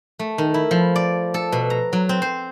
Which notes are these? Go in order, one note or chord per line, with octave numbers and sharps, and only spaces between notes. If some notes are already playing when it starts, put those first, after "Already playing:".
A3
D#3
E4
F3
D5
A4
B2
A#5
F#3
C4
C5